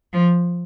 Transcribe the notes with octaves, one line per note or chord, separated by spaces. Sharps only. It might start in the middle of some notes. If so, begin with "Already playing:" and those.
F3